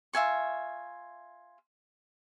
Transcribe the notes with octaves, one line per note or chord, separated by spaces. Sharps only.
F4 E5 G#5 C#6